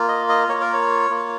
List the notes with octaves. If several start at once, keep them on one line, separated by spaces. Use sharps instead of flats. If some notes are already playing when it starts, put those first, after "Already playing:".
Already playing: A#3 F4
D#5
D#5
A#3 F4 C#5
A#4
C#5
A#3 F4